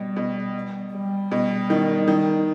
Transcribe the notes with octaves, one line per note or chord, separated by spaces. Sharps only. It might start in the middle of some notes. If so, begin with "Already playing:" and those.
Already playing: B2 G3
B2
G3
B2
D#3
D#3